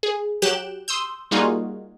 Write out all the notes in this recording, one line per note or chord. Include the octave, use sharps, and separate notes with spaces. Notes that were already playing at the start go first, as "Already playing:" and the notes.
G#4
F#3 G4 F#6 G6 D7 E7
C6 D#6 E6 G6
G3 A#3 D#4 F4 F#4 G#4